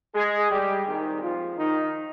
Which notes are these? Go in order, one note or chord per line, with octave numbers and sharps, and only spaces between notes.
G#3 G#4
G3 G4
C2 A#2 D#3 G#3 C4 D#4
F3 F4
D#3 D#4